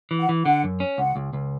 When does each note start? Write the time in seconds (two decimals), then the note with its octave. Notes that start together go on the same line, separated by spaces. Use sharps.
0.11 E3
0.20 F#5
0.29 E3
0.45 D3 F#5
0.64 F#2
0.80 C#4
0.98 C#2 F#5
1.16 C#2
1.33 C#2